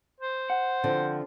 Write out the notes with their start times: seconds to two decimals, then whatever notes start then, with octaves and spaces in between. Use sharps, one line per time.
0.20 C5
0.50 F#5
0.84 D3 F3 C4